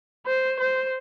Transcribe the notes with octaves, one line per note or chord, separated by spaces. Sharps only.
C5
C5